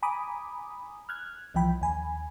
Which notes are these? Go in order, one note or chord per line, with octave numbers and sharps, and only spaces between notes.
G#5 A#5 B5 D6 D#6
F6 F#6 G#6
C2 E3 F3 G5 B5
D#2 G#5 B5